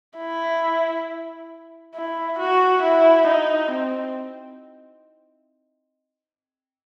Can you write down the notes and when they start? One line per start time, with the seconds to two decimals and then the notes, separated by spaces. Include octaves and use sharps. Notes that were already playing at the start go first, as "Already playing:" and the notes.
0.18 E4
1.94 E4
2.39 F#4
2.83 E4
3.27 D#4
3.71 C4